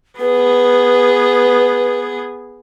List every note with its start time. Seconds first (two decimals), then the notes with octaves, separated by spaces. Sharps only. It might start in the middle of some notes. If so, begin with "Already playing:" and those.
0.20 B3 G#4 B4